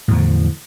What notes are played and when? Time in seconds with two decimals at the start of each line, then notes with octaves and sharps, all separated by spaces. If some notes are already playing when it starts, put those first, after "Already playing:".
0.08 A2
0.11 E2
0.13 F3
0.16 D3